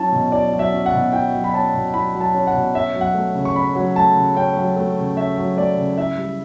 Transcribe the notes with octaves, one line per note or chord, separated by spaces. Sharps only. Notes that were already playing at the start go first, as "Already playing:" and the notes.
Already playing: F#3 C#4 E4 A5
B2
E4 D5
F#3
E5
C#4
F#5
B2
E4 G5
F#3
B5
C#4 A5
B2
E4 B5
F#3
A5
C#4
F#5
B2
C#4 E5
F#3
F#5
A3
C#3
C#6
C#4 B5
F#3
A3 A5
C#3
C#4 G5
F#3
A3
C#3
C#4 E5
F#3
A3 D5
C#3
E4 E5
G3